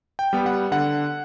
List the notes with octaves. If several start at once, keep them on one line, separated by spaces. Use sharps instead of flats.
G5
G3 B3
F#5
D3 F#5